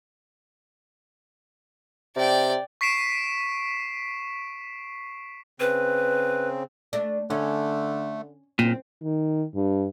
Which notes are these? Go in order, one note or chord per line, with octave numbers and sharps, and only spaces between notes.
C3 D5 G5
C#6 B6 C7 D7 E7
C#3 C4 B4
A3 D4
D3 A3 C#4
F#1 A#2 C4
D#3
G2